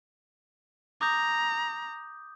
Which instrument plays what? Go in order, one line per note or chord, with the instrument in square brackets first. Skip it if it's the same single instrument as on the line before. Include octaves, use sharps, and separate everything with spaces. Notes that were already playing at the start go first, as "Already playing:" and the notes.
[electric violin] A#5 [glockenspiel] D6 D#6 G6